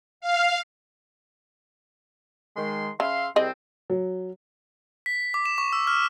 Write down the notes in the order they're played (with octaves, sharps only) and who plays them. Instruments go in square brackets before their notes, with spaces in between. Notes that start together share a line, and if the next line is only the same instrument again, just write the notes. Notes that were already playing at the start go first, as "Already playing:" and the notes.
[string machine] F5
[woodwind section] D#3 G#3 C6
[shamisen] C#3 [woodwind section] E5 F5 C6
[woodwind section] C2 C4 [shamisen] G#4 D#5
[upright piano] F#3
[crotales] B6
D6
E7
C#6
E6
F6